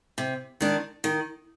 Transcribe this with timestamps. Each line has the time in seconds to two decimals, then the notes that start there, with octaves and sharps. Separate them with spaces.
0.18 C3
0.61 D#3 G#3 D4
1.04 D#3